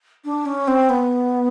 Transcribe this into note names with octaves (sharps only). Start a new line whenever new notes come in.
D4
C#4
C4
B3